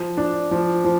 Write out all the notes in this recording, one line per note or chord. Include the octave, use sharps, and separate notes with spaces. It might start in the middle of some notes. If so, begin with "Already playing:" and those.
Already playing: F3
D4
F3
F3